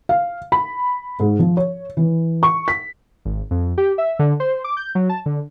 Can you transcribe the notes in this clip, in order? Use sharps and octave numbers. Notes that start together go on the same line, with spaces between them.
F5
B5
G#2
F3
C#5
E3
C#6
B6
G#1
F2
G4
E5
D3
C5
D6
G6
F#3
A5
D3